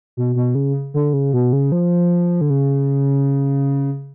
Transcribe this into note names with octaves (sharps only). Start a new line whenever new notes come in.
B2
B2
C#3
D3
C#3
B2
C#3
F3
D3
C#3